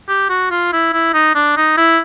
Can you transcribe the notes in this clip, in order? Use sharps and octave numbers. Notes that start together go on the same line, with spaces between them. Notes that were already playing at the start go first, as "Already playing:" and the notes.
G4
F#4
F4
E4
E4
D#4
D4
D#4
E4